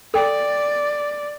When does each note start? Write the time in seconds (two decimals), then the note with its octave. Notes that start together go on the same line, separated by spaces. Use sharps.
0.14 A4 D5 G5